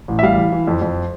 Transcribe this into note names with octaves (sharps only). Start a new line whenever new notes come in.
A1
E5
G3 F5
E3
E3
F2
F2